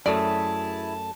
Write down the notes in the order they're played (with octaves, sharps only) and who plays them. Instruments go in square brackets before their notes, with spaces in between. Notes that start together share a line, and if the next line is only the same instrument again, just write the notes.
[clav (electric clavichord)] F#2 A3 [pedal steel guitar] E4 G#4 [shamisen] D5 [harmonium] A5